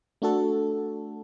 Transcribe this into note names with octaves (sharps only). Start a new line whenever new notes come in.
A3 D4 F#4 A4